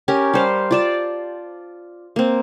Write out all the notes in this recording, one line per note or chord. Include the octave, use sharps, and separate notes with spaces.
C#4 G4 A#4
G3 C5 F5
F4 D5 A5
A#3 C4